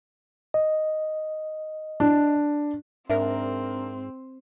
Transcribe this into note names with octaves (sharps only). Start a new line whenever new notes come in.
D#5
D4
G#2 C4 D4 A#4 E5